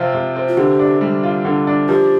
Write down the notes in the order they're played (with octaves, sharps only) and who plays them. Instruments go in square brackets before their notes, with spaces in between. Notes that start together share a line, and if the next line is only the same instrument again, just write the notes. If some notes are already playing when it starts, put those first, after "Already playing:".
Already playing: [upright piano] C3 F3 C4 F4
C3
C4
[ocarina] F4
[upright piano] D3 [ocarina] G4
[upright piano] D4
G3
F4
D3
D4
[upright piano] F3 [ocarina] G4